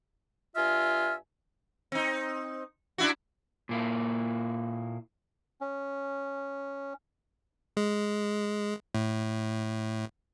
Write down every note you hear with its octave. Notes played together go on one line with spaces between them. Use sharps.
G2 F4 E5 G#5 F6
C4 D#4
D4 E4 F#4
A#2 A#3 E4
C#4
G#3
A2